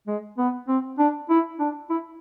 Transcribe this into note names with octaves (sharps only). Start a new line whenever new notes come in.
G#3
B3
C4
D4
E4
D4
E4